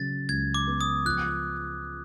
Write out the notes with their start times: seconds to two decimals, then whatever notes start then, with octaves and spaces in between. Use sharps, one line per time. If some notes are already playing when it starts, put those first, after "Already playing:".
Already playing: C#3 F#3 A6
0.29 C#2 G#6
0.54 D6
0.67 B3
0.81 D#6
1.05 F3 F#6